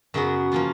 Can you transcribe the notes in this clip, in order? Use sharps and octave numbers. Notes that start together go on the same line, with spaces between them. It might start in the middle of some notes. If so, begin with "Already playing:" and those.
F#2 C#3 F#3 B3 F#4
F3 A#3 C#4 F4